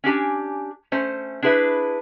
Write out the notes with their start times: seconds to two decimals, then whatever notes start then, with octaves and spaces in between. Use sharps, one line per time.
0.04 C#4 D4 G4 G#5
0.92 A3 C#4 C5
1.42 D4 E4 G#4 B4 E5